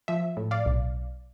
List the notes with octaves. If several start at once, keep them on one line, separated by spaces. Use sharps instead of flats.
F3 E5
A2
D5 F5
B1